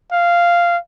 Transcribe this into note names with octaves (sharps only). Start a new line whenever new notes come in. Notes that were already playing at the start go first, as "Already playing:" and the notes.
F5